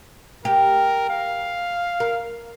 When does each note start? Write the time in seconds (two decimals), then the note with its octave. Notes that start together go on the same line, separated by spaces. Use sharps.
0.45 G4 A#4
1.10 F5
2.00 A#4